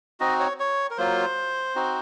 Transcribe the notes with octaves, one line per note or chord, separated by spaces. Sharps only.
C4 D#4 F#4 D#5
C#5
C#5
A#4
F#3 A#3 F4 C5
C4 D#4 F#4